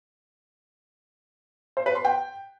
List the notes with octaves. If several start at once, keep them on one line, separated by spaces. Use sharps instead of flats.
C5
B4
C6
G5